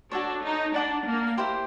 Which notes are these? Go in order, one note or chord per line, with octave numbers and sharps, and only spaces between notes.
D4 F#4 A4 C#5
D#4
D4 D5 F#5 A5 D6
A#3
E4 G4 C5